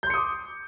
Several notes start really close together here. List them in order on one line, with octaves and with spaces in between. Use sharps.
G6 C6 C#7 D#6 D6